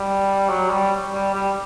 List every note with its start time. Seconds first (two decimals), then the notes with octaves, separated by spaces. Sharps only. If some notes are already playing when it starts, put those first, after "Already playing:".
Already playing: G3
0.49 F#3
0.70 G3
1.13 G3
1.34 G3